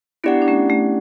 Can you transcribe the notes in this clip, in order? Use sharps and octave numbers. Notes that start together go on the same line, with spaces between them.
B3 D4 E4 G4 D5 F#5
D4
A3 C#4
A3 C#4